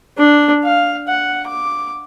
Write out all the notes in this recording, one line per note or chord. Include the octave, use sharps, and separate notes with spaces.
D4
F5
F#5
D6